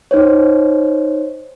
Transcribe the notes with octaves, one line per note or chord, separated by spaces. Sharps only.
D#4 C5 C#5